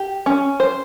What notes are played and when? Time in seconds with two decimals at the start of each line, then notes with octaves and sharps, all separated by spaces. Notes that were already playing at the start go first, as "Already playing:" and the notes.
Already playing: G4
0.26 C#4
0.60 C5